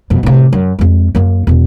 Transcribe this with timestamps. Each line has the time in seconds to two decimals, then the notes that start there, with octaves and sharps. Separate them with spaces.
0.10 F2 B2
0.23 A2 C3
0.53 F#2
0.79 F2 G#3
1.15 F#2 A#3
1.47 E2 B2